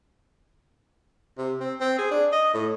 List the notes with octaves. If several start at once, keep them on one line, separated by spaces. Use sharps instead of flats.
C3
C4
C4
G#4
D4
D#5
A2